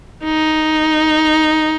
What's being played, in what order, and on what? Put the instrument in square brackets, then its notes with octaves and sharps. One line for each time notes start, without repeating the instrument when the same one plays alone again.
[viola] D#4